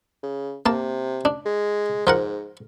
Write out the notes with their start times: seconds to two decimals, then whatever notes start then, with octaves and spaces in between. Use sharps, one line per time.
0.23 C#3
0.66 C3 A#3 A5
1.25 D4
1.45 G#3
2.07 G#2 F3 A#4 F#5